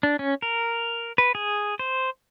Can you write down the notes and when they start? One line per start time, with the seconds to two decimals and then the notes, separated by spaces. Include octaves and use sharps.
0.03 D4
0.19 C#4
0.42 A#4
1.18 B4
1.35 G#4
1.79 C5